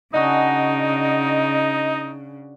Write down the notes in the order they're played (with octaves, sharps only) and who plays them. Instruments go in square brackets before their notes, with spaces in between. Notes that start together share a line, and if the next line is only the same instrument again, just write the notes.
[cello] C#3 [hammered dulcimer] D4 F#4 G#5 [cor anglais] D#4 [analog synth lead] D#5